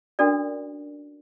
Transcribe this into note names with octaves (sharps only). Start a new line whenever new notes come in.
C#4 D4 F#4 A4 A#4 D5